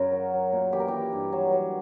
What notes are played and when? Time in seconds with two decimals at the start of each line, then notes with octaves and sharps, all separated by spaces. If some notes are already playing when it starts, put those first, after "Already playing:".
Already playing: F#2 C#3 A#4
0.12 F#3
0.33 F#3
0.52 A#2
0.72 E3 G4
0.80 A#4
0.88 G4
0.93 E3
1.13 G2
1.33 F#3
1.52 F#3